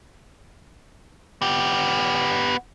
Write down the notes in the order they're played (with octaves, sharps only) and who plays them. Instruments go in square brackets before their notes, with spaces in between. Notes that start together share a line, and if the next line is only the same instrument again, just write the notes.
[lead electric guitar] B3 G4